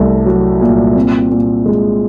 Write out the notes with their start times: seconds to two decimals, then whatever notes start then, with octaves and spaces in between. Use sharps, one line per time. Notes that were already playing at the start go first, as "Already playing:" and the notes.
Already playing: C2 A3
0.26 F#3
0.61 A#2
0.96 C4
1.31 A#2
1.66 G#3